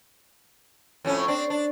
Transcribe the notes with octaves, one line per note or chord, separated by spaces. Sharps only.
F2 A2 C#4
C4 D4
D4